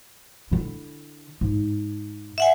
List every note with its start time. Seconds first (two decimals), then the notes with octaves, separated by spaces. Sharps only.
0.51 D3 E4
1.41 G#2
2.38 E5 F#5 G#5